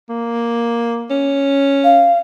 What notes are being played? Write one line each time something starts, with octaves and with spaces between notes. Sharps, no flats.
A#3
C#4
F5